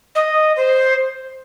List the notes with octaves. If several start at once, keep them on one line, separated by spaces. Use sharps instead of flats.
D#5
C5